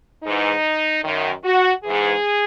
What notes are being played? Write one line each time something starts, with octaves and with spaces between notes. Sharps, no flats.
G#2 E3 D#4
F#2 D#3
F#4
G#2 E3 G#4